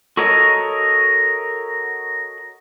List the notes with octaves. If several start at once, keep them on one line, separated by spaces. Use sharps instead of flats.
F#4 A4 A#4 C#5 D#5